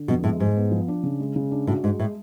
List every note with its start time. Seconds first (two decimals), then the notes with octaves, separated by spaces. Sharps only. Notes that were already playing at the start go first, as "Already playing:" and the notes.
Already playing: D3
0.08 F2 B2
0.24 A2 G#3
0.40 G#2 G#4
0.57 B3
0.71 F3
0.88 D4
1.03 C#3
1.20 G#3
1.36 C#3
1.51 D4
1.67 A2 F#4
1.83 G#2 G#3
1.99 A2